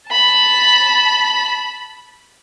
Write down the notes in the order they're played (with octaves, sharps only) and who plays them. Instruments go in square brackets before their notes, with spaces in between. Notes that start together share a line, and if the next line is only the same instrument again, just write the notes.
[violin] A5 B5